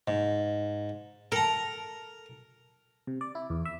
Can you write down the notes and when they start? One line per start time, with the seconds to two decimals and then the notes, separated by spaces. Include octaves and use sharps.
0.08 G#2
1.32 A4 A#4 A#5
3.07 C3
3.21 D5
3.35 E4
3.50 E2
3.65 E5